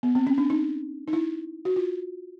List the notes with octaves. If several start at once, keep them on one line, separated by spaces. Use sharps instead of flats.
B3
C4
C#4
D4
D#4
D#4
E4
F#4
F4